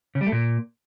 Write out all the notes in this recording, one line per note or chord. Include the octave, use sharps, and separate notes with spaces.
C#3
G3
A3
A#2